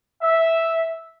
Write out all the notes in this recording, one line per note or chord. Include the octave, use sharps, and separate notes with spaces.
E5